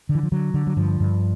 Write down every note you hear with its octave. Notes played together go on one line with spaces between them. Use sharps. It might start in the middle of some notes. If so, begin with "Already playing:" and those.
D3
E3
F3
D3 F#3
D3
F#3
G2 F3
G2